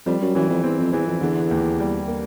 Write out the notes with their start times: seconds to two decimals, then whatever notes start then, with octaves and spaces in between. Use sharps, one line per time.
0.06 F2 G3
0.21 F#2
0.35 F#2 E3
0.50 F2
0.64 E2 C4
0.78 F2
0.93 E2 E3
1.07 F2
1.21 E2 D3
1.51 D#2
1.80 G3
2.08 A#3